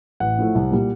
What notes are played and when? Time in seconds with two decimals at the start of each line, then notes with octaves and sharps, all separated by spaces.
0.20 A1 F#5
0.39 A2 F3 A3
0.55 C2
0.71 A#2 G3